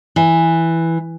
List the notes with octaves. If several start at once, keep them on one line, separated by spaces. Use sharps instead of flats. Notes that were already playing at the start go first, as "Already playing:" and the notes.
E3